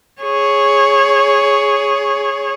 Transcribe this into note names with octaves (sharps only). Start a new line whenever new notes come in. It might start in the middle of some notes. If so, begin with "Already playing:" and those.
G#4 C#5